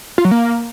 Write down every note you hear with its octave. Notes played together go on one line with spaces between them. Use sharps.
F4
F#3
A#3